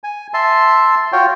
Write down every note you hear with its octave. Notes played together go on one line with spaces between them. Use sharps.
G#5
E5 A5 C6
F4 F#4 C#5 G5